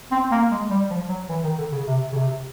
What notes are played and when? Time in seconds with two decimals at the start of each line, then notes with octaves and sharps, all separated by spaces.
0.11 C4
0.31 A#3
0.51 G#3
0.70 G3
0.90 F3
1.09 F#3
1.29 E3
1.44 D#3
1.57 D3
1.72 C#3
1.87 C3
2.12 C#3
2.17 C3